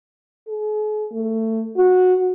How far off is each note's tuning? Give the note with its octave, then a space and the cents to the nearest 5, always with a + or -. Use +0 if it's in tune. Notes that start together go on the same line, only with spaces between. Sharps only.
G#4 +45
A3 +20
F#4 -15